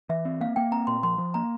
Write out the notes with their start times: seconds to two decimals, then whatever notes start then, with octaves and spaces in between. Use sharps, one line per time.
0.09 E3 E5
0.25 C4
0.41 A#3 F5
0.56 A#3 G5
0.71 C4 A#5
0.87 A#2 C6
1.03 F3 C6
1.18 F3
1.34 A#3 A#5